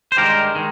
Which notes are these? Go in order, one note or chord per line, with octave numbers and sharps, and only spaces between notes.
C5
G2 D#3 G#3 G4 A#4
D#3 G#3